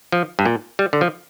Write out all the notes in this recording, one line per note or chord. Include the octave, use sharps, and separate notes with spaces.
F3
G2
A#2
G3
D3
F3